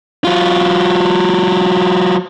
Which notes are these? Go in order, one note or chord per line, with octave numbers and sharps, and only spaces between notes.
F#3 F4